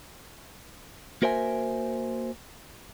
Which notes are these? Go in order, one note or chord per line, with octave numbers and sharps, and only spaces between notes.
A#3 F#4 A#4 C5 E5 G#5